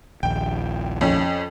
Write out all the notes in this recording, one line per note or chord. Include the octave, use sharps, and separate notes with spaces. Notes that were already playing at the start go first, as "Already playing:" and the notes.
A#1 D#2 G5
F2 C#4